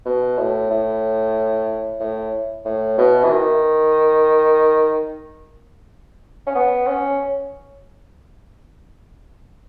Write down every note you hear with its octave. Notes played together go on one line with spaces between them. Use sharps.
B2
A2
A2
A2
A2
B2
E3
D#3
C#4
B3
C#4